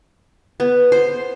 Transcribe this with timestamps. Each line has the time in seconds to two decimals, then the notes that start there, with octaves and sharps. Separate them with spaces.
0.60 B3
0.92 C5